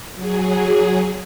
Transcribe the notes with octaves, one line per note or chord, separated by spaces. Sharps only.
F#3 G#4